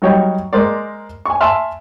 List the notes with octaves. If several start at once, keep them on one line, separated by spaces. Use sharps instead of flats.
F#3 G3 D#4 F#4 C#5 G5
G#3 A#4 C5 D5
G#5 C#6
E5 G#5 A5 C6 F6